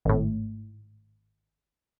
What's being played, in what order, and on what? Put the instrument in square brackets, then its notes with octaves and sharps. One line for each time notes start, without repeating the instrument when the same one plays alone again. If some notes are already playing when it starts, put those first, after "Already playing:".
[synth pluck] G#1 A2